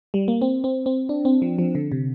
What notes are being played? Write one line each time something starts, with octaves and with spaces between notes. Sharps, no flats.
G3
A#3
C4
C4
C4
D4
C4
F3
F3
D3
C3